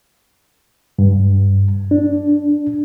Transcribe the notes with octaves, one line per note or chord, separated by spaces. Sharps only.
G2
D4